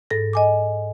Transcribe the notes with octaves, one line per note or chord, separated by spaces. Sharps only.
G#2 A4 A#6
D#5 G#5 D6